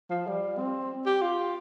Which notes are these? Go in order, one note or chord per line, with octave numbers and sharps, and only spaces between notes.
F3
G3
C4
G4
F4